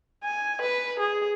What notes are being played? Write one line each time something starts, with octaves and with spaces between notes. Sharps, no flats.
G#5
B4
G#4